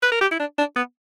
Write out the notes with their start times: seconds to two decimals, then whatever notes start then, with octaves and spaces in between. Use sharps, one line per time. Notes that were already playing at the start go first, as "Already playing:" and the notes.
0.03 B4
0.12 A#4
0.21 G4
0.31 E4
0.40 D4
0.58 D4
0.76 B3